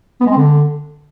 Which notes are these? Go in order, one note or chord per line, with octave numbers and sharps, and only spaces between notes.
B3
G#3
C4
D3